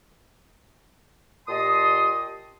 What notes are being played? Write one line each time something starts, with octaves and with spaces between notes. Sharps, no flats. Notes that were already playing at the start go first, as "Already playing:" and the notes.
A#2 G4 D#5 A5 C6 D#6